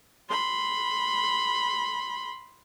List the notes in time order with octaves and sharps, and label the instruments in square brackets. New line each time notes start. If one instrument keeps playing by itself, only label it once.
[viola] B5 C6